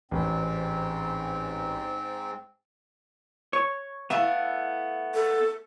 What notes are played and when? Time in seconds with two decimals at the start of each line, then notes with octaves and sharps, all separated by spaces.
0.11 A1 G#2 C4
3.53 C#5
4.10 A3 B3 E4 E5 F5
5.14 A4